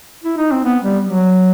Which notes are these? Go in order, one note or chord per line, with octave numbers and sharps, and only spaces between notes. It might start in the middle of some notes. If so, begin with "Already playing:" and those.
E4
D#4
C4
B3
G3
F#3